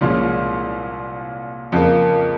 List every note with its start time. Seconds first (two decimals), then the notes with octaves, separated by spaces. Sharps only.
0.01 C2 A#2 F3 G#3 C#4
1.72 F2 C#3 F3 A#3